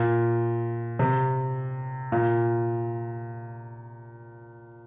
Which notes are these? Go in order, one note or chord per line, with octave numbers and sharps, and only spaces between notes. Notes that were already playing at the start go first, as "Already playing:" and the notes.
Already playing: A#2
C3
A#2